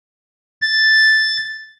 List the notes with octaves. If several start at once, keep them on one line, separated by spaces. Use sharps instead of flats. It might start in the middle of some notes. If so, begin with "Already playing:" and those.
A6